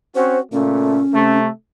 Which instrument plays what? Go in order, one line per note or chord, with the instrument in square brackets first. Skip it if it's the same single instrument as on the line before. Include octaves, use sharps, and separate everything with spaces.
[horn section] C4 C#4 F#4 [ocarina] C5
[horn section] A#2 C#3 A3 [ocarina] C#4
[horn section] C3 A3